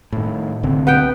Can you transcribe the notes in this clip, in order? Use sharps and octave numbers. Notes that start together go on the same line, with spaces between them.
A2 D#3
C2 D3 C4
B3 F#5 G5